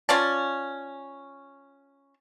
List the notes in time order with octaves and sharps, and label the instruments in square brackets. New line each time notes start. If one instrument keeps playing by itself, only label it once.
[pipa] C#4 F4 D5 A5